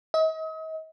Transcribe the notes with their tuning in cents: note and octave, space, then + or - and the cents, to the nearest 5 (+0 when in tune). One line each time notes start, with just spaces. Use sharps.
D#5 +40